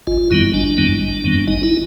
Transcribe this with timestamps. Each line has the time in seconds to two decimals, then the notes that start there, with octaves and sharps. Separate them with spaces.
0.07 G#1 F4
0.30 F#2 D#3 G3 B3 E4
0.54 G#1 D4
0.77 F#2 D#3 G3 B3
1.01 G#1
1.24 F#2 D#3 G3 B3
1.47 G#1 D#4
1.63 E4